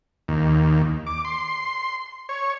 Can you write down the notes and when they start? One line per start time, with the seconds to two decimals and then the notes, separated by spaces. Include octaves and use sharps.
0.28 D#2
1.07 D6
1.25 C6
2.29 C#5